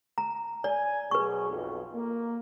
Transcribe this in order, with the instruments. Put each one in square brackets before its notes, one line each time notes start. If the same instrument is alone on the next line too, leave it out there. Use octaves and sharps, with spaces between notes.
[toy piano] A#5
[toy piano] D5 [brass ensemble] G#5
[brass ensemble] B2 F#3 G#4 [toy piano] B4 C#6
[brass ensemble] B1 F2
A#3